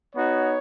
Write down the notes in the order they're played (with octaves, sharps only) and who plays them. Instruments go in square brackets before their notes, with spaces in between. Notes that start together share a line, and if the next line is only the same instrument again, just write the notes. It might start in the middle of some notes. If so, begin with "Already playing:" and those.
[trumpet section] B3 D#4 F#4 C#5